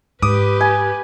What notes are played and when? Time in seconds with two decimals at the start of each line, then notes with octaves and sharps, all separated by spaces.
0.22 G#2 G4 B4 D6 D#6
0.61 G#5